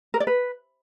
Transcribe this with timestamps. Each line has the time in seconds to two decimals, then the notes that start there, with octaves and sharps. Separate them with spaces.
0.14 A#4
0.20 D5
0.27 B4